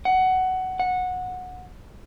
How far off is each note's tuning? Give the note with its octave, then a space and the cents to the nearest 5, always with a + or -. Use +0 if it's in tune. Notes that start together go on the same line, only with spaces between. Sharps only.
F#5 +15
F#5 -15